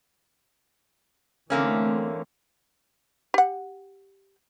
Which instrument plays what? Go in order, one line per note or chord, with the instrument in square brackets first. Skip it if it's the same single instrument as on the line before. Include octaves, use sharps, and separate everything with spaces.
[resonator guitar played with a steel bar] D3 A#3 C#4 [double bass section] E3 A3 C4
[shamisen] G4 F#5